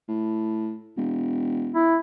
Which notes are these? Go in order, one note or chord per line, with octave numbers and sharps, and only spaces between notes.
A2
E1
E4